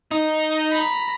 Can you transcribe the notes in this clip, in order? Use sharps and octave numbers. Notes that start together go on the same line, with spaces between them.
D#4
A#5 B5